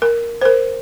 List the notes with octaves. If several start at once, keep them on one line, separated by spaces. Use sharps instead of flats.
A#4
A#4 C5